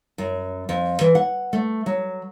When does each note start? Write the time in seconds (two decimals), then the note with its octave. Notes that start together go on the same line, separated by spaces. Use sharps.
0.18 F#2
0.69 F2
1.01 E3
1.15 F#5
1.53 A3
1.86 F#3